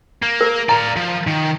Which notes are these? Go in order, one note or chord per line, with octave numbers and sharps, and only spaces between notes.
A#3
A#4
D5 F5 A#5
F3
D#3